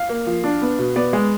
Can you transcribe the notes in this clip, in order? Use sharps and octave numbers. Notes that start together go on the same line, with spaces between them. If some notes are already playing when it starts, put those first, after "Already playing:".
Already playing: F5
A#3
F3
D4
B3
B2
B3 D5
G#3